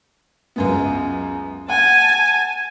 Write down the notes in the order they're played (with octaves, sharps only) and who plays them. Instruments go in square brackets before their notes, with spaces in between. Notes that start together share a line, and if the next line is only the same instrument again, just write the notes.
[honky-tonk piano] C#2 F#2 B3
[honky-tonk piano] F#5 [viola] G#5 A5